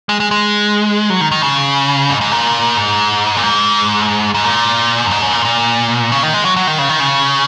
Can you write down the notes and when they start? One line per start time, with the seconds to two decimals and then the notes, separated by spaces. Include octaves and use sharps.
0.09 G#3
0.20 G#3
0.31 G#3
1.10 F#3
1.21 D#3
1.31 D#3
1.43 C#3
2.10 G#2
2.21 G#2
2.32 A#2
2.77 G#2
3.37 A#2
3.43 G#2
4.34 G#2
4.44 A#2
5.06 F#2
5.11 G#2
5.22 F#2
5.33 A#2
5.45 A#2
6.12 C#3
6.23 D#3
6.34 G#3
6.45 F#3
6.56 F#3
6.67 D#3
6.78 C#3
6.89 D#3
7.00 C#3